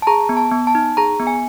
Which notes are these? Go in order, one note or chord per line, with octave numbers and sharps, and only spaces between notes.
A5
G#4 A#5
B3
A5
B3
A5
D#4
G#4 A#5
B3
G#5